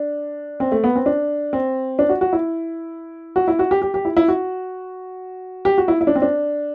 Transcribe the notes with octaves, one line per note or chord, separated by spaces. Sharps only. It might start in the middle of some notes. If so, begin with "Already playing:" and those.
Already playing: D4
C4
A3
B3
C4
D4
C4
D4
F#4
F#4
E4
F#4
E4
F#4
G4
G4
G4
E4
E4
F#4
G4
F#4
E4
E4
D4
C4
D4